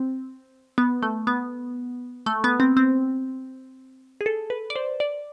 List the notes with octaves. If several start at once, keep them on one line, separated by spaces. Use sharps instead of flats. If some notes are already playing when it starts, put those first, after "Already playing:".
Already playing: C4
B3
A3
B3
A3
B3
C4
C4
G#4
A4
B4
D5
C5
D5